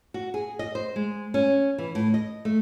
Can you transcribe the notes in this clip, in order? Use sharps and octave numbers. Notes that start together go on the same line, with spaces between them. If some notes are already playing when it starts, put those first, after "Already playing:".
F#4
G#4
D#5
C5
G#3
C#4
E3
A2
D#5
A3